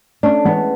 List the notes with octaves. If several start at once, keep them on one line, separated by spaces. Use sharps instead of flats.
A3 C#4 D4
E3 G#3 B3